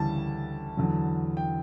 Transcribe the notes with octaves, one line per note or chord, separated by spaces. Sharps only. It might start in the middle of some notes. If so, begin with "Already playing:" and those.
Already playing: D2 C#3 E3 G3 A5
E2 D3 F#3
G5